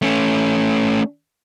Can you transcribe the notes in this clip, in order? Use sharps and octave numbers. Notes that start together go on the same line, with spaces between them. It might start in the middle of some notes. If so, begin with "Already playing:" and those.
A3 C#4